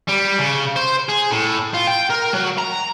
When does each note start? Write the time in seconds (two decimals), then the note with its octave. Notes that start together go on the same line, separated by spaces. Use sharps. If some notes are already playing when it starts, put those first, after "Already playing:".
0.09 G3
0.39 C#3
0.76 C5
1.09 G#4
1.31 A2
1.74 F4
1.87 G5
2.10 A#4
2.33 F#3
2.58 A#5